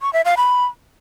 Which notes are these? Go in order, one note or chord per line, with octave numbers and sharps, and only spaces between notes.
C#6
E5
F5
B5